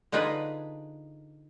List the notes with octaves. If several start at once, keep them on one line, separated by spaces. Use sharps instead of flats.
D3 D4 D#4 F4 G#4 B4